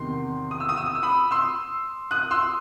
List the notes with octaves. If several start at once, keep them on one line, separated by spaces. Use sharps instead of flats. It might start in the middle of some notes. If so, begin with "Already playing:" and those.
Already playing: E2 C3 D#3 C6
D#6
E6
D#6
E6
D#6
E6
B5 D#6
C6 E6
D#6 F#6
C6 E6